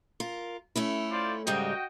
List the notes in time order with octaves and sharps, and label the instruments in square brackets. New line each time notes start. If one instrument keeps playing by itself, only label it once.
[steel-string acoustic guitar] F4 A#4
A3 C#4 E4
[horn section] F4 C5 D5
[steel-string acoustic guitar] G#2 C#3 G3 [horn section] F#4 D#5 G5